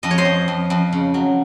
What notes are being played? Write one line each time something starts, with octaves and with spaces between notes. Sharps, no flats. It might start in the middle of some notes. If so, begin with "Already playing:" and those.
F2 D#5
C#5
C5 D#5
F2
F2
F2
C#3
F#3